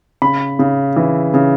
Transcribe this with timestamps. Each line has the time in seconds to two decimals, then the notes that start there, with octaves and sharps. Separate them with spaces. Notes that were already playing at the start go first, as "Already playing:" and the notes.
0.22 C#3 B5
0.59 C#3
0.96 E3
1.34 C#3